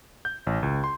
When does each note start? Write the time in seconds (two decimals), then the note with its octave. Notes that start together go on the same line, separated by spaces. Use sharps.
0.25 G6
0.47 A1
0.63 C#2
0.84 C6